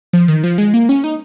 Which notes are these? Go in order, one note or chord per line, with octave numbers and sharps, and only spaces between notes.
F3
D#3
F3
G#3
A#3
C#4
D#4